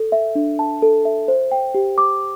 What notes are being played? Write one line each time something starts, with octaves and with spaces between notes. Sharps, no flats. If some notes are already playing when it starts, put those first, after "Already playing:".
Already playing: A4
E5
D4
A5
A4
E5
C5
G5
G4
D6